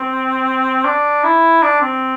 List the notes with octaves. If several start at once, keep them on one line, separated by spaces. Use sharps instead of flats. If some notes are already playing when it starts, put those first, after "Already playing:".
Already playing: C4
D4
E4
D4
C4